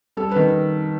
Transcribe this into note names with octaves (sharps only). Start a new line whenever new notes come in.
G3 A4
D#3 B4